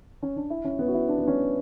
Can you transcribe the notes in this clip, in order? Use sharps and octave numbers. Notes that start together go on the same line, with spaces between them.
C#4
D4
E4
C#4
B3
F#4
E4
D4
B3
C#4